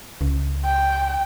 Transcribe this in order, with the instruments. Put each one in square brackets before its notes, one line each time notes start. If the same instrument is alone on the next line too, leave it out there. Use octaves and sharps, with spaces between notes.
[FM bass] C#2
[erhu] G5